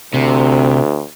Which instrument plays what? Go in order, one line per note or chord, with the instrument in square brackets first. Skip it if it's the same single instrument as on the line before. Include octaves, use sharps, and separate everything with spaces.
[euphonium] D2 [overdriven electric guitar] C3